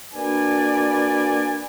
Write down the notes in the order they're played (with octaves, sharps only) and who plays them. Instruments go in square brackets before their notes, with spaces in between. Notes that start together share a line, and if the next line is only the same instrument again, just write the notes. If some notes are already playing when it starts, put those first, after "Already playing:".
[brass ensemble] A#3 D4 F#4 B4 D5 G#5